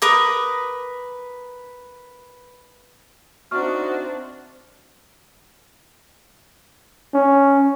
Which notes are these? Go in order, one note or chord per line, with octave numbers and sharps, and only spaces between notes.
A#4 B4 D6 D#6
C4 D4 D#4 F#4 E5 C#6 F6
C#4